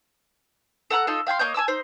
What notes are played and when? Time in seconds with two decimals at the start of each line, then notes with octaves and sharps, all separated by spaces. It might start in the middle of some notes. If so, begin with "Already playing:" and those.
0.90 A4 F#5 A#5 F#6
1.07 D#4 F4 A4
1.27 F5 G5 G#5 C6
1.39 A#3 C#5 D#5 G6
1.54 G#5 A5 D6 E6
1.68 D#4 C5